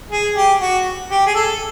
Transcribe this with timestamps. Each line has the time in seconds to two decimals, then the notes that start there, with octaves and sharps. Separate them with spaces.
0.11 G#4
0.36 G4
0.62 F#4
1.11 G4
1.27 G#4
1.35 A4